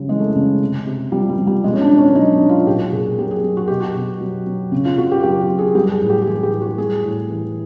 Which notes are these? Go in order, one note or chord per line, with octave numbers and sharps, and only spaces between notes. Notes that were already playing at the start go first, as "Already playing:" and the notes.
Already playing: C#3 F#3 G3
E3 G#3
A3
G#3
C#3
C3
C3
F3 G3
G3
F3
G3
B2 G#3
C#4
D4
B2
C#4
D4
F#3 D#4
D4
F#3
F4
A#2 G4
F#4
A#2 G#4
F#3 G4
G#4
F#3
F#4
B2 G4
F#4
B2
F#3
F#3
C#3
F4
C#3 F#4
G4
F#3 G4
F#4
F#3
G#4
G3 G4
G#4
A2
G4
G4
E3 G#4
G4
A2
F#4
G3 G#4
A2
E3